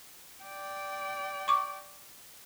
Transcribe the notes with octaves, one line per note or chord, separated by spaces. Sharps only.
D5 G5
C#6 D6